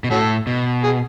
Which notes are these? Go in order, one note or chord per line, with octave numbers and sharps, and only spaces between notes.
B2
A2 C#4 F#4 A4
B2
G#4